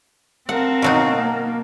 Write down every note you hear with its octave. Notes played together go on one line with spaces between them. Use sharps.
C4 A#4 F5 F#5 A5
B2 F#3 D#4
A#3